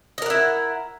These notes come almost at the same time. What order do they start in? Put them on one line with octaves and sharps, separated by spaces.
D#5 A#4 F#5 E4